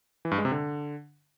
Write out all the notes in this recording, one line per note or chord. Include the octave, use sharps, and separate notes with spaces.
E3
G2
G#3
C3
D3